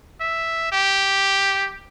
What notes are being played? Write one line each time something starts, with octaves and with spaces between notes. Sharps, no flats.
E5
G4